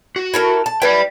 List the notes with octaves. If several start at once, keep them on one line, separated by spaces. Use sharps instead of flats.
F#4
E4 A4 A#4
A5
E4 B4 D5 G5